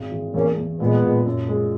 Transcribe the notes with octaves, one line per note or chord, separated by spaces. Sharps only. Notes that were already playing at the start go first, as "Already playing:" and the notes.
Already playing: G#1 G#3
E3
E2 A#3 C#4
E2
A#2 G#3 B3
A#2
F#2
G#3